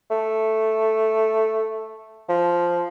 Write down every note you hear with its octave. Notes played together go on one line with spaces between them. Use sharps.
A3
F3